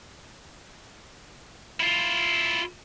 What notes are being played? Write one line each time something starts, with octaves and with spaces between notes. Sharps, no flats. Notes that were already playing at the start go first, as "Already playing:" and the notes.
E4 F4